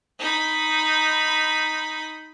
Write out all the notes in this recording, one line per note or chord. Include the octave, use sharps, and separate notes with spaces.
D#4 B5